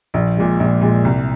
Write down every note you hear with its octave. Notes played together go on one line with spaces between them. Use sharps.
A#1
A#2 G#3
A#1
A#2 G#3
C2